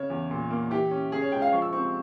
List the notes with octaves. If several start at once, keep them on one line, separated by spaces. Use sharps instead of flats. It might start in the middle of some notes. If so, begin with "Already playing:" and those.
Already playing: C#3 C#5
E2
A#2
A#3
E3 G4
C#4
C#3 G#4
C#5
C#2 G5
F5
F3 C#6
E6
C4 C#6